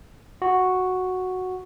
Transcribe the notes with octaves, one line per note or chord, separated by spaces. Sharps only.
F#4